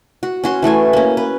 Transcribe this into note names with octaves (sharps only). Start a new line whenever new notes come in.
F#4
C#4 F#4 C6
E3 A3 A4 G#5
A#3 C#4
B4